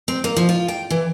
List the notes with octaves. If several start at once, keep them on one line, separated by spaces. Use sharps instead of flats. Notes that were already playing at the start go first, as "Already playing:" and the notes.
C4
A#3
F3
F4
G5
E3